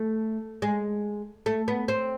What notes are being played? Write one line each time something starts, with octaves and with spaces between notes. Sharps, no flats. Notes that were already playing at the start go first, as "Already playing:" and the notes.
Already playing: A3
G#3
A3
B3
C4